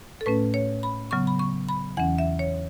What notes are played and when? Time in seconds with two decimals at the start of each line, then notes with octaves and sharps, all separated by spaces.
0.21 A4
0.26 A2 A3 C#4 B4
0.54 C#5
0.83 B5
1.11 C#3 F#3 B3 C#6
1.27 B5
1.39 C#6
1.69 B5
1.97 E2 E3 C#4 F#5
2.18 E5
2.39 C#5